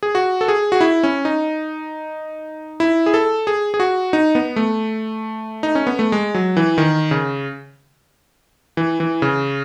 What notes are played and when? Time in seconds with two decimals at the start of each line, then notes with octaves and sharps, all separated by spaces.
0.03 G#4
0.15 F#4
0.41 A4
0.48 G#4
0.72 F#4
0.81 E4
1.03 C#4
1.25 D#4
2.80 E4
3.06 G#4
3.14 A4
3.47 G#4
3.74 G#4
3.80 F#4
4.13 D#4
4.35 B3
4.56 A3
5.63 D#4
5.75 C#4
5.87 B3
5.99 A3
6.12 G#3
6.35 F#3
6.57 E3
6.78 D#3
7.11 C#3
8.77 E3
9.00 E3
9.22 C#3